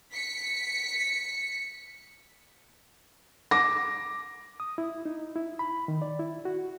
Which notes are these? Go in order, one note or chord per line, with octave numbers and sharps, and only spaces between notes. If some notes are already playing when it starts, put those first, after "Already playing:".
B6 C#7
D6 A#6
D#6
E4
D#4
E4
B5
D#3
D5
E4
F#4